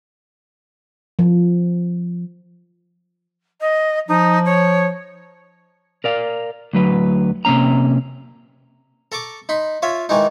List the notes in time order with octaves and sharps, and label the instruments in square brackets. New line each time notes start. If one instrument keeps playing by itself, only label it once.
[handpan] F3
[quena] D#5
[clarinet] F3 [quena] D#4
[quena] C#5
[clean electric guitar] A#4 D5 F5
D2 F#3 B4
C3 A#3 C#4 A#5
[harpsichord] A4 A#5 C#6 D6
D#4 B5 C6
F4 C#5 E5
D#3 E3 G#3 D#4